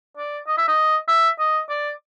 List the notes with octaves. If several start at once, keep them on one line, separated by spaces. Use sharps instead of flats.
D5
D#5
E5
D#5
E5
D#5
D5